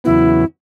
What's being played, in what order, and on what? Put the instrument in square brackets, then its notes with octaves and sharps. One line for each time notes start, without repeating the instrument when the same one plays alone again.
[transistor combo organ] E2 C#3 F#3 B3 [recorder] E4